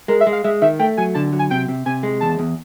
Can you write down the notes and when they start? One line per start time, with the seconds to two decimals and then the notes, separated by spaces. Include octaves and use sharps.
0.08 G#3 A#4
0.21 E5
0.27 G#3
0.32 F5
0.44 G#3 E5
0.62 D#3 E5
0.79 A3 G5
0.97 F#3 G#5
1.14 D3 A5
1.33 F#3
1.39 G#5
1.50 C3 G5
1.68 C3
1.86 C3 G#5
2.03 G#3
2.21 E2 A5
2.39 E2